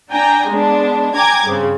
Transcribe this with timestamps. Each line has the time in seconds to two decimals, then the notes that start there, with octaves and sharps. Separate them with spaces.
0.11 D4 G5 G#5 A#5
0.49 G#3 B3 D4
1.15 G5 G#5 A#5 D6 G#6
1.46 G2 C#3 C4